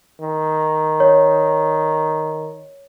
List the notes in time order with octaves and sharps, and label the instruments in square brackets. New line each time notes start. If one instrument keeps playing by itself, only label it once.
[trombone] D#3
[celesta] C#5